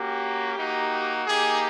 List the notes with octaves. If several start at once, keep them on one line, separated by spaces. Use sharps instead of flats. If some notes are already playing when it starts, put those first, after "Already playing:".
Already playing: A#3 C#4 F#4 G4
A#3 D#4 F#4
A#3 D#4 G4 G#4